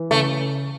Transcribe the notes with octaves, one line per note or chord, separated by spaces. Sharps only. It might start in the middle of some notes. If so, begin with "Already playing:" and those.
Already playing: E3
C#3 A3